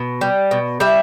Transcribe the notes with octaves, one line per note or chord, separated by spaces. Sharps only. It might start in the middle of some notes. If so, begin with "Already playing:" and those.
Already playing: B2
G3
B2
G3 E5